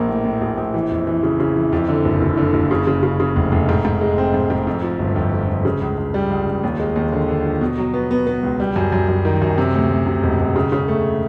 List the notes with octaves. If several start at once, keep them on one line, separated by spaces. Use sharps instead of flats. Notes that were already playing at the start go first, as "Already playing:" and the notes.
Already playing: A#1 A#3
A2
A2
A#1
A#1
E3
F2
E3
C#3
C#3
E3
F2
D3
F#1
F#1
D3
F#1
C#3
C#3
C#3
C#3
F1
F1
G#2
G#2
G#3
C4
G#2
G#2
F2
F3
G1
F2
F3
F2
C#3
C#2
C#2
G3
C#2
C#2
D#2
G#3
D#2
D3
D3
F3
B2
F#3
B3
B3
B3
C#2
G3
F#2
F#2
F#2
D#3
F#2
C3
D2
D2
C3
E1
E1
C#3
C#3
A3